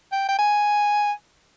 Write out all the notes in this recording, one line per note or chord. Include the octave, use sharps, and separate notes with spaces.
G5
G5
G#5